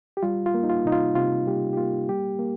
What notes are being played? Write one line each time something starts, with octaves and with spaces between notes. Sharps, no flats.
G4
G3 F4
F4
A#3
D#4
F4
C3 D#4
F4
C3 F4
G3 G4
G4
A#3 F4
G3 G4
A#3